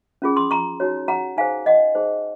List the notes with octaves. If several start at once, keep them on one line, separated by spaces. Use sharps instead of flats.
C#4 F4 G#4
C6 D#6
A#5 C#6
D#4 F#4 C#5
F#5 A#5
D#4 G#4 C5 F5 G#5
D#5 F#5
D#4 G#4 C5